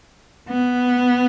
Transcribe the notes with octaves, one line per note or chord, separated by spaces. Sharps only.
B3